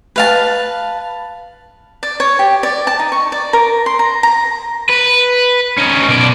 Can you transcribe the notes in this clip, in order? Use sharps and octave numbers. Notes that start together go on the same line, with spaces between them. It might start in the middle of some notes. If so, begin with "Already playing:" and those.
B4 F5 A5
D5
C#5
G4
D5
A5
D#4
C#6
D5
A#4
C6
A#5
A#5
B4
C#4 D#4
B2 D5